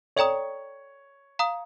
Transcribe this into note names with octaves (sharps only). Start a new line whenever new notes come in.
A4 C#5 D5 G5 A#5 D#6
F5 A#5 D#6